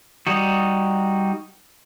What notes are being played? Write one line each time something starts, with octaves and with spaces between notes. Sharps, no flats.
G3 D#4 F#4